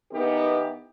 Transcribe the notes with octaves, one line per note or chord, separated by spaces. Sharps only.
E3 B3 D#4 G4 A#4